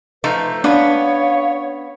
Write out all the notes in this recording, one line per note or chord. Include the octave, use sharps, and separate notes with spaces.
F3 A3 D#4 B4
B3 C#4 D4 C#5 F5